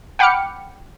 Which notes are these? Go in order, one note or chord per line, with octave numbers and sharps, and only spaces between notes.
F#5 G5 B5 D6 F6 C#7